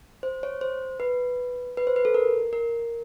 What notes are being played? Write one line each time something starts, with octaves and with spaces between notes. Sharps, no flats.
C5
C#5
C5
B4
B4
C5
B4
A4
A#4
A#4